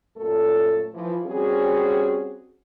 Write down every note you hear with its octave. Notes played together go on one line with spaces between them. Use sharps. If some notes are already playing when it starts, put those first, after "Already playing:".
F#2 A#2 A3 A4
E3 F3
G3 C4 C#4 F#4 G#4